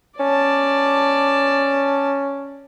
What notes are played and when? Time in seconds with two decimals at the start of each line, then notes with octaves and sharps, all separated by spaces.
0.20 C#4 D5 A5